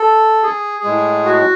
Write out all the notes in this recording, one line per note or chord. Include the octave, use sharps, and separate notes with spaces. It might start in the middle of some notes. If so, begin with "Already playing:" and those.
Already playing: A4
G#4
A2 G#3
F#4